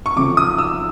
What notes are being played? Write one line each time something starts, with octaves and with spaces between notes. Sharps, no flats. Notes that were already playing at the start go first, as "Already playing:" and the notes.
C#6
F2 C#3 F3 D6
D#6
E6